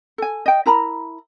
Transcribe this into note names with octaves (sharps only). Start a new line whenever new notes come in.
A4 G#5
D#5 G5
E4 A#4 A#5 B5